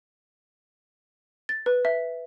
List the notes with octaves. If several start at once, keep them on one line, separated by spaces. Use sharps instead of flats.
A6
B4
E5